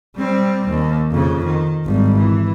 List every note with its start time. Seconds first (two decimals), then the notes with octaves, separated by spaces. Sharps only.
0.16 G3 C4
0.69 D#2
1.11 F2 C#3
1.45 D#3
1.86 G#1 G3
2.18 E3